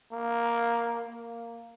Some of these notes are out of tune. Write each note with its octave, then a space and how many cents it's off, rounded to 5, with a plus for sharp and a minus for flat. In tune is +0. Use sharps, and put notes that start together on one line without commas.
A#3 +5
A#3 -5